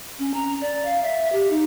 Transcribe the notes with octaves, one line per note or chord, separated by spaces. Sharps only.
C#4
A#5
D5
F5
E5
G4
D#4